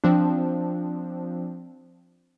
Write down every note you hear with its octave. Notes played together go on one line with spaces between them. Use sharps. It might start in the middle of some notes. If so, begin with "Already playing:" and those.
F3 C4 D4